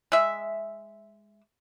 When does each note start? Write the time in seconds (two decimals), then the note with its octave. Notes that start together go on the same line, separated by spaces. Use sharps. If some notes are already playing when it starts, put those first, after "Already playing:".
0.12 G#3 E5